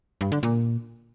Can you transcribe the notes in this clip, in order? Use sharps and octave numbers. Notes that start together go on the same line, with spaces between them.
G2
D3
A#2